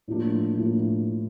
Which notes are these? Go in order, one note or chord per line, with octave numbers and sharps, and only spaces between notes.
A2 F3 A#3 D4
A2 F3 A#3 D4